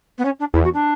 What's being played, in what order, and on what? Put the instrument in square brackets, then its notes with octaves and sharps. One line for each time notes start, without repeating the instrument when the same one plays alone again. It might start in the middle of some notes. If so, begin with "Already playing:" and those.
[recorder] B3
C#4
D4
[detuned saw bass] E2 [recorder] E4
[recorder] F#4
D4